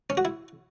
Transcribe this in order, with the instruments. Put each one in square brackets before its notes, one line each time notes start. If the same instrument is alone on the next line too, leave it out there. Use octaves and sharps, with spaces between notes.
[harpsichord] C#4
F#4
E4